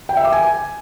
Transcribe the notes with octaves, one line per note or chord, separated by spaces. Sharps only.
G5
E5
D6
G#5